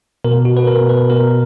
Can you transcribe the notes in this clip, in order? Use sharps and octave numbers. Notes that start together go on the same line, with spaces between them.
B2 A#4
F#4
B2 B4
A#4
B2
B4
B2 A#4